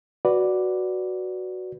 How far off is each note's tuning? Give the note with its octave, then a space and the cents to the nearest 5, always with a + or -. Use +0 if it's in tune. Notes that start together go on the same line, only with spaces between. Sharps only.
F#4 +0 B4 +0 D5 +0